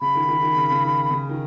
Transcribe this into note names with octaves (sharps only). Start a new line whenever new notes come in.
C#3 B5
D#3
D#3
D#3
C#3
C#3
D#3
C#3
D#3